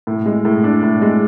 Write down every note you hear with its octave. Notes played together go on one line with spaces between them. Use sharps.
A2
G#3
A2
D4
A2
G#3